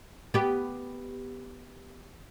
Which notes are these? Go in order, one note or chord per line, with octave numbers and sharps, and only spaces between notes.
B3 G4